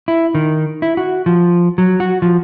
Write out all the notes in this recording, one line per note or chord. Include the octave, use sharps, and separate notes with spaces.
E4
D#3
E4
F#4
F3
F#3
F#4
F3